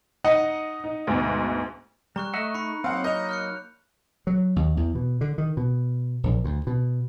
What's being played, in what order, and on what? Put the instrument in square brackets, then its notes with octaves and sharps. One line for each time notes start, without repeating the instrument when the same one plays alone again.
[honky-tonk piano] D#4 [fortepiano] D#5 F#5
[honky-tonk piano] D#4
D2 G#2 B2
[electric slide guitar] G3 [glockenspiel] A#5 C#6 F#6
[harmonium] A3 [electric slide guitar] D#5 E5 F#5 [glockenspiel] F#6
[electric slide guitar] D#4 [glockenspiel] B5 C#7
[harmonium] F#3 A#3 D#4 [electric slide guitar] C4 [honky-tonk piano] F5 F#5
[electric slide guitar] A#4 [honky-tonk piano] D#5 [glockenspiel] G6 F7
[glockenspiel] F6 F#6 C#7
[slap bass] F#3
D#2
E2
B2
D3
D#3
B2
A#1
D2
B2